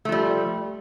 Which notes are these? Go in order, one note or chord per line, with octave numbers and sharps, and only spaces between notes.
F3 G3 A3